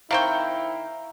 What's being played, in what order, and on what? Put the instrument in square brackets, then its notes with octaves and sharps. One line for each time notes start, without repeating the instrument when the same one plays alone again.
[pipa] D#3 C4 G5 [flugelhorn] E4 [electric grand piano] F5 A#5 C#6